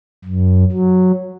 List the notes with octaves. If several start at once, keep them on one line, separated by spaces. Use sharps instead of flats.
F#2
F#3